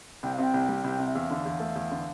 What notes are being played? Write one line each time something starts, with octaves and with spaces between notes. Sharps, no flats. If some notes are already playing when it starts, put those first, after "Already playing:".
C2 G5
F5
C3 G5
C2
G3
C2
C3
E5
E2 F5
D3
E2
A3
E2
D3